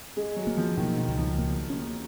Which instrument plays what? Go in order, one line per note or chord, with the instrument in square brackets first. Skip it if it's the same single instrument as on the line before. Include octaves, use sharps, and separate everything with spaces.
[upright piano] G#3 [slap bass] C#4
[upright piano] F#3
[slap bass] A#3
[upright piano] F3
[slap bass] B2 [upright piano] D#3
[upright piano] D#3
[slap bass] C#2
[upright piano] F3
[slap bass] A#3
C#4